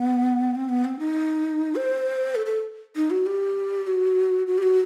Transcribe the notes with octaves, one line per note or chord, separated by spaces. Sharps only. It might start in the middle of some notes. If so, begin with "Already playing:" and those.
Already playing: B3
C4
B3
C4
D#4
C5
A4
A4
D#4
F#4
G4
F#4
F#4
G4
F#4